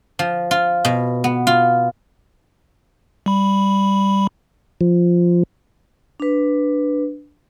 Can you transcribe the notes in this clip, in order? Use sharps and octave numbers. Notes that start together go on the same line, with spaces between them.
F3
F4
B2
B3
F4
G3 B5
F3
D4 B4